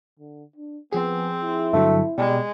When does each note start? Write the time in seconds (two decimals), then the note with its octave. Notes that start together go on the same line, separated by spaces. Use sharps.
0.19 D3
0.56 D4
0.93 F3 B3 C4 G#4
1.42 E4
1.73 G2 D3 F#3 A3
2.18 B2 G3 G#3